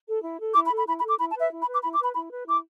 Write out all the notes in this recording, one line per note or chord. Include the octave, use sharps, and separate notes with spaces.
A4
E4
A4
E4 D6
B5
A4
B5
E4 B5
B5
A4
D6
E4 B5
A5
B4
E5
E4
B5
B4
D6
E4 B5
D6
B4 B5
E4 B5
B4
E4 D6